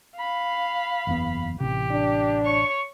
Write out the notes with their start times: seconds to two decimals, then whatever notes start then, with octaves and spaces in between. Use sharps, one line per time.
0.16 F5 B5
1.07 F#1 E2 B3
1.60 A1 C3 G4
1.91 D4
2.44 C#5 C#6